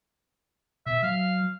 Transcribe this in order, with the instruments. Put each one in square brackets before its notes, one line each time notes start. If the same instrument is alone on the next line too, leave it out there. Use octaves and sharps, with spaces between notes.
[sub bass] B2 [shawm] E5
[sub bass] F#3 [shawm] F5